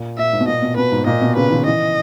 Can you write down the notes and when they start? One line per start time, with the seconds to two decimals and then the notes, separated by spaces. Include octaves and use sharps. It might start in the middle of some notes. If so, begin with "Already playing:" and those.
Already playing: A#2
0.18 A#2 E5
0.33 G#2
0.40 B2
0.47 A#2 D#5
0.62 B2
0.77 B2 B4
0.92 G#2
1.06 A#2 D#5
1.21 B2
1.36 C#3 B4
1.50 D#3
1.65 E3 D#5